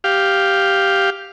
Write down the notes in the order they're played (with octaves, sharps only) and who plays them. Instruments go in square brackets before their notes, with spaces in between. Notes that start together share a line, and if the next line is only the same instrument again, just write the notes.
[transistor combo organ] G4 F5